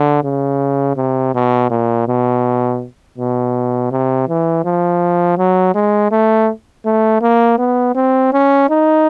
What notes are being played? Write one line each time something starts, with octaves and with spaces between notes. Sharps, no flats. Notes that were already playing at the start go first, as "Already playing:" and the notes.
Already playing: D3
C#3
C3
B2
A#2
B2
B2
C3
E3
F3
F#3
G#3
A3
A3
A#3
B3
C4
C#4
D#4